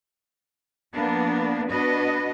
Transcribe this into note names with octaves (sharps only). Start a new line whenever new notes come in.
F3 A#3 B3 D4
B3 D4 F#4 B4 D#5